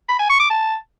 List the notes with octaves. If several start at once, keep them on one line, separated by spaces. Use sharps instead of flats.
B5
G#5
C#6
D6
A5